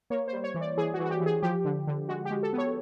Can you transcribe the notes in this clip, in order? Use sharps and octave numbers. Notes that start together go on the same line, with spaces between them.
A#3 C#5
C5
G3
C#5
E3
D5
E3 G#4
F#4
E3
F#4
G4
E3
G#4
F3 G4
D3
D3
G#3 F#4
G4
G#3
A4
B3
C#5